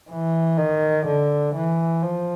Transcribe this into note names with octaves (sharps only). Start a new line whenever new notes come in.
E3
D#3
D3
E3
F3